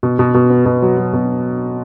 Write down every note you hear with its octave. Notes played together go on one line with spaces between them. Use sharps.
B2
B2
B2
B3
B2
F#3
F#3
B2